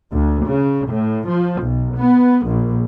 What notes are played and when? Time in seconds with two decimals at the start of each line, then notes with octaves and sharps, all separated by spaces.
0.13 D2
0.47 C#3
0.88 A2
1.29 F3
1.63 B1
1.96 B3
2.48 A#1